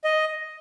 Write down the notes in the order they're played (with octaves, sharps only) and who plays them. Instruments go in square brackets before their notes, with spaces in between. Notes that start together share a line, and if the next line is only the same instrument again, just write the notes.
[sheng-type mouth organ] D#5